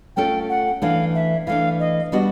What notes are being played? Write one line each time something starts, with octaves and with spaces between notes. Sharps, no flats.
A3 C#4 F4 A4 G5
F#5
E3 A3 D4 F5
E5
E3 A3 D4 F5
D#5
G3 B3 D4 F#4 D#5